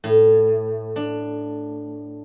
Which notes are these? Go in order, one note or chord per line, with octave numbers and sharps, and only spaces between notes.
A2
D4